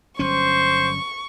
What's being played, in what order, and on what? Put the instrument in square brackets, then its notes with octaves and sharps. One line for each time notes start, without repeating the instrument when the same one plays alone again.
[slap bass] G1 F#3 C#4 [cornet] C5 [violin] C#6